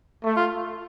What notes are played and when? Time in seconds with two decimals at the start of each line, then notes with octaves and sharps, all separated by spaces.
0.24 A3
0.37 F4